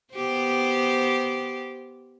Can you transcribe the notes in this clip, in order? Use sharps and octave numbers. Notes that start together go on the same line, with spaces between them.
B3 G4 C5